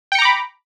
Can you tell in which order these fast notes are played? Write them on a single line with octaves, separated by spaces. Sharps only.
G5 C#7 A#5 D6 B5